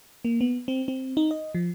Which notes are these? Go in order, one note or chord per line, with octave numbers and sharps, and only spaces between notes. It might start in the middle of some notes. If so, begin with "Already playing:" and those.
A#3
B3
C4
C4
D#4
D#5
F3